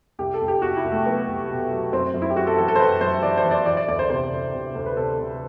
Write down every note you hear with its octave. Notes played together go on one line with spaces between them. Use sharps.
C2 G4
A4
C2
G4
C2 F#4
E4
C2
A3
F#3 B3
C2
B2
F#3
F#2 C4
F#2
E4
G4
F#2 F#4
A4
E3 A4
A4
C5
F#2 B4
F#2 C5
E3 D5
C5
E3
D5
E3 D5
D5
D2 D5
C5
C3 C5
D2
C3
D2
B4
C3 A4
C3